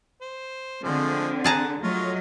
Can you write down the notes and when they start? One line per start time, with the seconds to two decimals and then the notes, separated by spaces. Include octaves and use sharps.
0.21 C5
0.84 D3 F3 G#3 A3 C4
1.44 G#4 F#5 A5 A#5
1.83 F#3 A3 F4 C#5 D#5